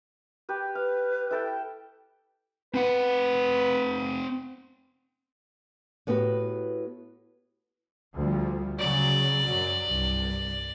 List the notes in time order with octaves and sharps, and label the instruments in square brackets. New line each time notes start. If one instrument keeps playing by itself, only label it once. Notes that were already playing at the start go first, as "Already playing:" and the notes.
[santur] G4 B4
[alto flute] B4 [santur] F5
[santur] E4 A4 G5
[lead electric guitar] C4 F#5 [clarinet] B4
[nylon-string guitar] A2 B3 F#4 G4 B4
[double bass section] D2 F3 G3
[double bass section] C#3 F#3 [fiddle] D5
[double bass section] F#2 F#3
C2 G2